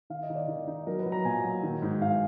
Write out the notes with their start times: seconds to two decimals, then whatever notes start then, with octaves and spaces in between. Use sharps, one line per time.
0.10 D#3 F5
0.23 D#5
0.30 D#3
0.35 D5
0.48 D#3
0.67 D#4
0.87 F#3 A#4
0.99 B4
1.06 F#3
1.12 A#5
1.25 A#2 G#5
1.44 F#3
1.63 D#3
1.82 G#2
2.01 G#2 F5